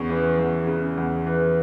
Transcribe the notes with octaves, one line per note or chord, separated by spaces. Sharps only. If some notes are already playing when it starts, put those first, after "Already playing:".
Already playing: E2 C#3 C#6
E3
E2
C#3
E2
E3